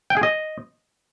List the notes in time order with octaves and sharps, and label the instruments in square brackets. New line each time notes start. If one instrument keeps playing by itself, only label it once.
[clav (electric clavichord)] G5
G#4
D#5